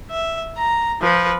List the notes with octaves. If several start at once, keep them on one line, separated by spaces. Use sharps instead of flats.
E5
A#5
F3 B4